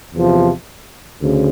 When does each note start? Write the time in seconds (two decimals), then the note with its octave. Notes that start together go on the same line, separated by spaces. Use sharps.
0.13 E2 C3 F3
1.20 D2 C#3